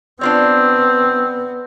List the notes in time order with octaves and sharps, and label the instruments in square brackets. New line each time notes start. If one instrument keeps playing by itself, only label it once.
[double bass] B3 [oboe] C4 [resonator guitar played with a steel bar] D4 F4 C#5